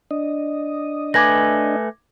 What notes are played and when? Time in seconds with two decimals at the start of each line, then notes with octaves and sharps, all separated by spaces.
0.11 D4 D#5
1.14 A3 B4 G#5 D6 G#6 A#6